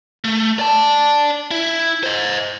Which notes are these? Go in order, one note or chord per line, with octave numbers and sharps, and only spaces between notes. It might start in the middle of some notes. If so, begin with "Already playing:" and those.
A3
D5 A5
E4
C5 D#5